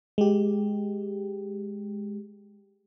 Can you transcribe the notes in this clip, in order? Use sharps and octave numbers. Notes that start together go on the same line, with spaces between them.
G#3 G4